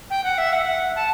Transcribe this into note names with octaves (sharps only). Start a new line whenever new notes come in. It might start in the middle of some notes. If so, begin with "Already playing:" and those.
G5
F#5
E5
F#5
A5